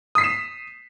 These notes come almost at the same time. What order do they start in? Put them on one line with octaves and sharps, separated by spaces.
D#6 B6 C7 E7